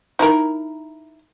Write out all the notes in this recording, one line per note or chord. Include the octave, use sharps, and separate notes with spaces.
D#4 E4 A#4